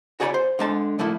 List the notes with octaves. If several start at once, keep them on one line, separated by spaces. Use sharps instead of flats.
F#4 G#4 C#5 D5 A#5 B5
C5
D3 G#3 A5
F3 A3 A#3 E4